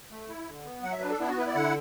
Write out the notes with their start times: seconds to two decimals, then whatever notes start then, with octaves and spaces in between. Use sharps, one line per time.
0.11 A3
0.29 E4
0.47 D3
0.65 B3
0.83 F#3 F#5
0.92 E5
1.01 D4 B4
1.10 A4
1.19 B3 E4
1.28 F#4
1.38 E4 B4
1.47 D5
1.55 D3 F#5